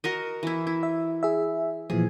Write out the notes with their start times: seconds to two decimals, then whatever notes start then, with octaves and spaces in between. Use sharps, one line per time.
0.04 F#4 A#4 D#5
0.43 E3 E4
0.67 E4
0.83 E5
1.23 G#4 E5
1.90 A#2 E3 F3 G#4